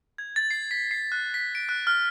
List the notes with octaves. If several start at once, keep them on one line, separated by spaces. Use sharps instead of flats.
G#6
A6
C7
B6
C7
F#6
B6
D7
F#6
F6